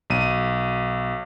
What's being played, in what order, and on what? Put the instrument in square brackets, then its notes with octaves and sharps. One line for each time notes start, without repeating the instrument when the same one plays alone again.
[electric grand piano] B1 D#7